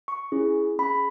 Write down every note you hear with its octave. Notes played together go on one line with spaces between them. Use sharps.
C#6
C#4 E4 G#4
C#4 G#4 B5